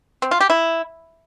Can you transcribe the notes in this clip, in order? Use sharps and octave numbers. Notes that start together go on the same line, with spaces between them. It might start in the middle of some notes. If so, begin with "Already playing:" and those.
C4
F4
G4
E4